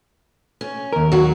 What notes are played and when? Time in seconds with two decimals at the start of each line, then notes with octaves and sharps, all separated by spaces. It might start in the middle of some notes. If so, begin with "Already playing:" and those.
0.61 C#4
0.93 D#2 A#4
1.12 F#3 F#4